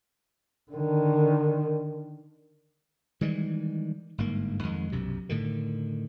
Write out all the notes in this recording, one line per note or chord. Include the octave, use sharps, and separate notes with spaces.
D3 D#3
D#3 E3 G3 G#3
G1 G#2 A#3
F2 D#3 G#3
B1 F#2 C3
A2 D3 D#3